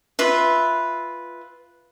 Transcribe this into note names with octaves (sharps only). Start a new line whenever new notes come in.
F4 B4 E5